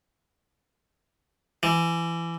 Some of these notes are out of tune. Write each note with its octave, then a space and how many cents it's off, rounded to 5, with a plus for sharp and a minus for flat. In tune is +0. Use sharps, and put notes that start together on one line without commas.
E3 +25